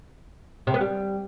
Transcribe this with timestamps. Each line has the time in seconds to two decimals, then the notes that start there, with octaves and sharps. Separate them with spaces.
0.67 C3
0.74 B3
0.81 G3